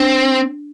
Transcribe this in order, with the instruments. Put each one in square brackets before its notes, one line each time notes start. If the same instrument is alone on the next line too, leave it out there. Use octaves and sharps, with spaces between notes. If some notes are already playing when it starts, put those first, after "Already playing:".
Already playing: [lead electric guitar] C4 [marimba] D4